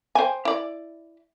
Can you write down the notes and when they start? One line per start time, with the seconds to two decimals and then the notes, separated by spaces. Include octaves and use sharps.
0.15 C5 G5 G#5
0.45 E4 D5